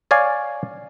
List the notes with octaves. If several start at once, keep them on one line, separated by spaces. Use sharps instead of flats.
C#5 D5 F5 G#5